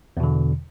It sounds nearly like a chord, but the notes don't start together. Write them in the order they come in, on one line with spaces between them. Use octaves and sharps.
E2 B2 D3